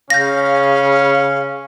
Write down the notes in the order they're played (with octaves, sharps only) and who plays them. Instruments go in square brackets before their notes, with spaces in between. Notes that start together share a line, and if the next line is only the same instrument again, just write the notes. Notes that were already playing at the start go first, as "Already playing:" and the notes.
[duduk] C#3 [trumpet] C#4 [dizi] F5 [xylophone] G6 A#6